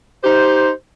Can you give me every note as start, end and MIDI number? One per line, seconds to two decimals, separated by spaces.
0.24 0.70 63
0.24 0.70 67
0.24 0.70 72